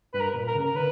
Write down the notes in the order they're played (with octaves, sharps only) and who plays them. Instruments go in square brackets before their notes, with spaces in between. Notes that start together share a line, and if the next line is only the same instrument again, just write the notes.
[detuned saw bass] G2 [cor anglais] B4
[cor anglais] A#4
[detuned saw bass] A#2
[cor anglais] A#4
[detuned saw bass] C#3
[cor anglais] A#4
[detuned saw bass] D3 [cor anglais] B4